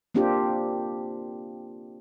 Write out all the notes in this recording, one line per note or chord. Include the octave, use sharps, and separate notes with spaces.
A#3 C4 D4 F4 G4